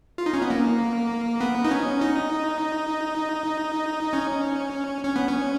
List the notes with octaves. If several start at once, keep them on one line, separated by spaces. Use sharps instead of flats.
F4
D#4
C#4
B3
A#3
B3
D#4
C#4
D#4
C#4
C#4
B3
C#4